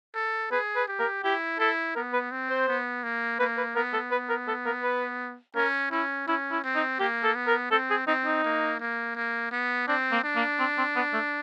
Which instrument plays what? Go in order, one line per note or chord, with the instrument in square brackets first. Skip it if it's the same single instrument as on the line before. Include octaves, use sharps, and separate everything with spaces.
[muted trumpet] A4
[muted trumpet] G#4 [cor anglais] B4
[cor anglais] B4
[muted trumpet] G4
[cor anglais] A#4
[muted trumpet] E4 [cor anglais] G4
[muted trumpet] E4 [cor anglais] A4
[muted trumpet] B3 [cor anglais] A#4
[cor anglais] B4
[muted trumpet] C4
[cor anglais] C5
[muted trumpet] B3
A#3
[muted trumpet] A#3 [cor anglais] B4
[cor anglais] B4
[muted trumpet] B3 [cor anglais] A#4
[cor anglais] A4
B4
A#4
A4
A#4
B4
[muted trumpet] C#4 [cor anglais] A#4
[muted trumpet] C#4 [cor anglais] E4
[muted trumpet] C#4 [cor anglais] E4
[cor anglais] E4
[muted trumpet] C4
[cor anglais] D#4
[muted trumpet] A#3 [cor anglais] G4
[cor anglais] A4
[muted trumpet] B3
[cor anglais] A#4
[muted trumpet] C4 [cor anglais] A4
[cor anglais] G#4
[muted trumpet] C4 [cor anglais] D#4
[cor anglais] D#4
[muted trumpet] A#3
A#3
A#3
B3
[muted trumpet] C4 [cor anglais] D4
[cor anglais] A#3
[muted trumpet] D4
[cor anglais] A#3
C4
C4
B3
A3